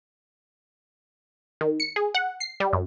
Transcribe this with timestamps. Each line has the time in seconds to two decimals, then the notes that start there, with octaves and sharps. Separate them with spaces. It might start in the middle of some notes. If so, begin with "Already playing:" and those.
1.61 D#3
1.80 C#7
1.96 G#4
2.15 F#5
2.40 C7
2.60 G3
2.73 F#2